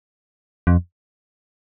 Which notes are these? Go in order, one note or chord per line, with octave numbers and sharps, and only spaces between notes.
F2